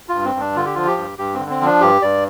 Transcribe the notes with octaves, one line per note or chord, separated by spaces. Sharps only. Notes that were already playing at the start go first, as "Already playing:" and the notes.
F4
G2
C4
G2 D4
D3 F4
G4
F3 F4
G4
G2
G2 G4
C4
D3
C4
F3 D4
G2 G4
G2 D5